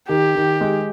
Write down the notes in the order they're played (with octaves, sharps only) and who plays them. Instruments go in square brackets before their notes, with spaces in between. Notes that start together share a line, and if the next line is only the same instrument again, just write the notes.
[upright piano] D#3 [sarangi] G4
[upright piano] D#3
G#3